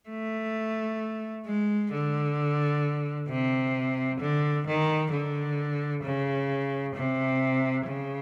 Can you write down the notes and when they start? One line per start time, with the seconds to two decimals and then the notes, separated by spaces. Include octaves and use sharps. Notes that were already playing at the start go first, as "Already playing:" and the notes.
0.09 A3
1.46 G#3
1.92 D3
3.29 C3
4.21 D3
4.66 D#3
5.12 D3
6.04 C#3
6.95 C3
7.86 C#3